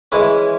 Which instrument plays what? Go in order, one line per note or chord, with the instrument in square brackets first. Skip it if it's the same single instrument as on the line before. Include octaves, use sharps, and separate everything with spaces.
[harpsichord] E3 G#3 C#4 E4